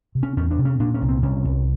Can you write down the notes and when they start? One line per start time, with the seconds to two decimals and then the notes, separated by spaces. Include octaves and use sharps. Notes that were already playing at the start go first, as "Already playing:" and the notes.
0.15 C3
0.23 C#4
0.37 E2 C#4
0.51 D4
0.58 C3
0.65 C#4
0.80 A#2 D4
0.94 C#4
1.01 C2
1.08 C4
1.22 C2 C#4
1.44 C2